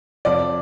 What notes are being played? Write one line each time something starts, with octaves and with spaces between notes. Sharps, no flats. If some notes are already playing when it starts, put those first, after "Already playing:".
F2 D5